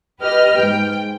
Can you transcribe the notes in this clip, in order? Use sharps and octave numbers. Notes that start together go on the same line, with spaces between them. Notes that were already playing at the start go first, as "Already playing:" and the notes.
G4 B4 D#5 F6
G#2 G5